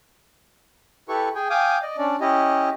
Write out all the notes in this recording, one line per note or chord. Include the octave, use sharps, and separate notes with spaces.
E4 G4 A4 B4 C#6
G#4 G5 G#5
F5 G5 G#5 D6 D#6
D5 D#5
C#4 D4 D5
C#4 E4 G4 D#5